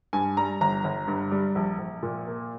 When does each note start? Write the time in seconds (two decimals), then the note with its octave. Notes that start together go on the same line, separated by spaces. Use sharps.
0.13 G2 G#5
0.37 G3 A#5
0.61 G1 A#5
0.84 G1
1.08 G2
1.31 G3
1.55 A#1
1.79 A#1
2.02 A#2
2.27 A#3